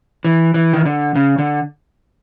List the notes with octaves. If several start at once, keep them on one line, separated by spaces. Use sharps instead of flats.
E3
E3
D#3
D3
C#3
D3